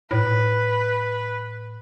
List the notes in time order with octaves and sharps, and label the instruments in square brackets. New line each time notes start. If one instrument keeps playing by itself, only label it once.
[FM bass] A2 [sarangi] B4